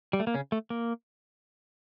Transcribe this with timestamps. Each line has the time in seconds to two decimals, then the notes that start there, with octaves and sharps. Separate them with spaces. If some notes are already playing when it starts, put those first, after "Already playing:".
0.13 G3
0.20 A3
0.27 A#3
0.34 C#3 C#4
0.52 A3
0.70 A#3